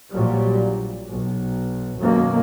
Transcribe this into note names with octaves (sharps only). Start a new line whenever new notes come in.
A#1 A#2 F#3 G3
B1
F#2 B2 D#3 A#3